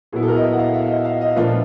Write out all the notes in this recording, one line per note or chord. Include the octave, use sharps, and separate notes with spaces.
A#2 F#3 B3 E4 G#4
A4
A#4
D#5
E5
F#5
F5
E5
D#5
F5
D#5
A#2 F3 A3 D4 F4 B4